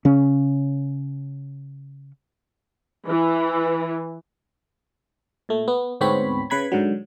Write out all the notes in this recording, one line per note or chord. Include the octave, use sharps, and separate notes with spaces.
C#3 C#4
E3
A#2 A3
B3
D2 G#2 B3 C4 C#5 B5
C#3 B4 B5 G#6
G#2 D3 F#3